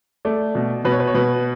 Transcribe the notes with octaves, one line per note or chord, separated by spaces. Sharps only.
A3 D5
B2
B2 B4
C#5
B4
C#5
B2 B4